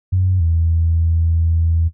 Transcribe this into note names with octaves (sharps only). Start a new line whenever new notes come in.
F#2
E2